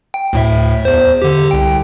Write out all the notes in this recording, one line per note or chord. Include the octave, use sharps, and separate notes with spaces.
G5
D2 A2 E5
E2 C5
D3 G4
C2 G5